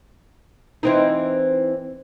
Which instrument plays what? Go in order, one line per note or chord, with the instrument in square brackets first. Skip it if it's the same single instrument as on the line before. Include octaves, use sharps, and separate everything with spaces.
[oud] E3 C4 D#4